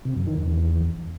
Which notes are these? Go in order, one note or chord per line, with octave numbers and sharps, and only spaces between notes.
C3
F#2
D#3
E2